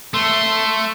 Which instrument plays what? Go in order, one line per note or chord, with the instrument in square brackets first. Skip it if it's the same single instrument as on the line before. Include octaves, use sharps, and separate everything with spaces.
[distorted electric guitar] A3 [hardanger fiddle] C6